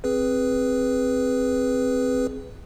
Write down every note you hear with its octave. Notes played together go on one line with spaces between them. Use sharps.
C4 G#4 B4